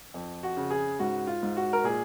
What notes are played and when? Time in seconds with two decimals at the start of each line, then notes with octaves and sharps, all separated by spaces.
0.14 F2
0.43 F#4
0.57 C#3
0.71 G#4
0.99 G#2 F#4
1.27 F4
1.43 G#2
1.57 F#4
1.73 A#4
1.84 A#2 G#4